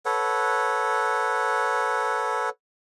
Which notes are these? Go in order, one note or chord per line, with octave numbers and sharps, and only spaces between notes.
A4 B4 C#5 F#5